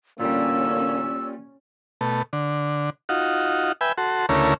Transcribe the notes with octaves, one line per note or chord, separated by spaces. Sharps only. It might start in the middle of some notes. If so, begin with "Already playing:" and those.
A1 A#2 D3 G3 A#3 C#4 E6
B2 A3
D3
D#4 F4 F#4
B4 E5 G5 G#5
F#4 A4 C6
D2 C#3 A3 C#4 E4 A#4